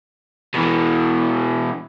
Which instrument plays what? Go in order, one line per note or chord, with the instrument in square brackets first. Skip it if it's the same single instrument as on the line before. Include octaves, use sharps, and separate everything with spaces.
[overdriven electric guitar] B2 E3